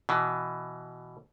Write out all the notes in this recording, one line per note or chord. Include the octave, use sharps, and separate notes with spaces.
B2 E3